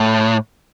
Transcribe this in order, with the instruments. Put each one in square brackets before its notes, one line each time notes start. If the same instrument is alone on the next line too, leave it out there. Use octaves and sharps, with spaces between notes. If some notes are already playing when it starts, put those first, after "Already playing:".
Already playing: [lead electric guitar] A2